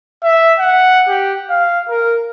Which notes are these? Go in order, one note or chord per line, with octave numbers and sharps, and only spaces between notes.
E5
F#5
G4
F5
A#4